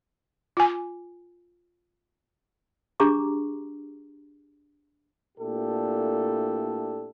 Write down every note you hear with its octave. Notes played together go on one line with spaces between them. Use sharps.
F4 G#5
D4 G4 G#4 A#5 C#6 D6
A#2 A3 D4 E4 G4 A4